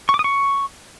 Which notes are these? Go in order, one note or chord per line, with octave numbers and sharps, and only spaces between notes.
C#6
D6
D#6
C#6